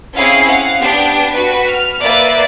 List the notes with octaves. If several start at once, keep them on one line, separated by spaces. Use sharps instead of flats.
C4 C#4 E4 G#4 F5 C7
F5 F#5 C7
B3 D4 G4
F#4 B4
F6
A#3 B4 D5 E5 A6